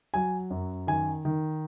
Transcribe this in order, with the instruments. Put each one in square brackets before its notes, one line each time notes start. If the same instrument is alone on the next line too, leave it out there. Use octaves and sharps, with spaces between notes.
[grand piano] F#3 G#5
F#2
D#3 G#5
D#3